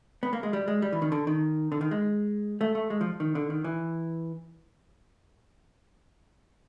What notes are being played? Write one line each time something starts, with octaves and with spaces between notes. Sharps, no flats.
B3
A#3
G#3
G3
G#3
G3
E3
D#3
D3
D#3
D3
D#3
G#3
A3
A3
G#3
F3
D#3
D3
D#3
E3